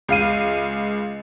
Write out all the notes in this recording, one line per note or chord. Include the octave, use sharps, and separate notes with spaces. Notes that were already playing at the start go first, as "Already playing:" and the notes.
C#2 F5 D#7